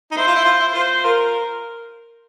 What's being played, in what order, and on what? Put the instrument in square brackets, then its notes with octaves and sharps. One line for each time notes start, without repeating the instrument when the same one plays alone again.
[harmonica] D#4
[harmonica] E4 [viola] C5
[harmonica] F4
E4
F4
E4
[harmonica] F4 [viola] C5
[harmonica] F4 [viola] A#4